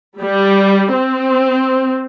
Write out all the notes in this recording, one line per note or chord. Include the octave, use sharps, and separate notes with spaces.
G3
C4